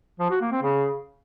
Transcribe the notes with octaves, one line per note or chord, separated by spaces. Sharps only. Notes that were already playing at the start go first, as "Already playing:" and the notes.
F3
F#4
A#3
C4
C#3